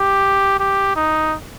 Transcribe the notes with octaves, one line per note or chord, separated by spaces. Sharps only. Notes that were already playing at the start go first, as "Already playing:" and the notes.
Already playing: G4
G4
D#4